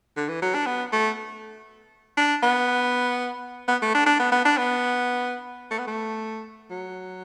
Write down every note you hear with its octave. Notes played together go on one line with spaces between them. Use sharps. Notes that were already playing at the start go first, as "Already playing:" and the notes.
D3
E3
F#3
D4
B3
A3
D4
B3
B3
A3
D4
D4
B3
B3
D4
B3
A3
B3
A3
F#3